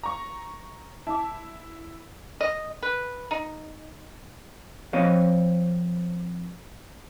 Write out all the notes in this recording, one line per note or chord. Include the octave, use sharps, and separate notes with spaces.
A#5 C#6
E4 A5 D6
D#5
B4
D#4
F3 C4 C#5 D#5 F5